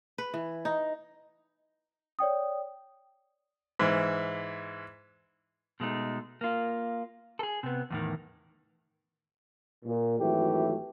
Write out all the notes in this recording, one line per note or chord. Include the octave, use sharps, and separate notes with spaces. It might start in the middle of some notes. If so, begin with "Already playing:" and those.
B4
E3
D#4
C#5 D5 G5 D#6
G#2 E3
B2 G#3 A3 D#4
A#3 F4
G#4 A4
C3 B3
E2 A2 D#3
A#2
G#1 E3 F#3 A3 G4